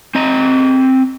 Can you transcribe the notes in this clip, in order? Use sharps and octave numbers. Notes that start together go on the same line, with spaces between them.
C4 D#5 A#5